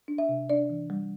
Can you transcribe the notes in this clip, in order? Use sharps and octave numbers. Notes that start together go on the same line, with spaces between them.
D4
E5
C3
D4 D5
E3
G3